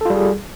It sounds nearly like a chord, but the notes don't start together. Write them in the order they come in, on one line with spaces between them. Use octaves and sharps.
A4 F4 G3 G#4